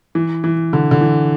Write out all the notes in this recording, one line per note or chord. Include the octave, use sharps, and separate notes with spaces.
E3
E3
D3
D3
E3